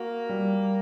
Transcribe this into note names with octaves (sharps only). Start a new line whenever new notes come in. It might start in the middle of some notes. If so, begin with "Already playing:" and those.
Already playing: A#3 F#4
G3